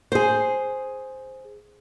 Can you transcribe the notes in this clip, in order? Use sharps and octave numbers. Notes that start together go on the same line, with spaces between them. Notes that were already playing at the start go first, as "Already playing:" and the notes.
G#4 C5